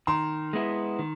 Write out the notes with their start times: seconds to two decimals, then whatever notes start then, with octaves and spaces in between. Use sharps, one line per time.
0.07 D#3 A#5 C6
0.53 G#3 B3 E4
0.99 D#3